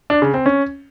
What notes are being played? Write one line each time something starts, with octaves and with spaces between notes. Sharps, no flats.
D4
C#3
C4
C#4